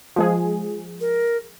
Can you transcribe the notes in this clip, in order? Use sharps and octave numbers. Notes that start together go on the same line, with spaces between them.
F3 G#3 G#4
A#4